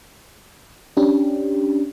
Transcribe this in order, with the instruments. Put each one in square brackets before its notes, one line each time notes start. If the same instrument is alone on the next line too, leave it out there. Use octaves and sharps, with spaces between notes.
[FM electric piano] C#4 D4 G4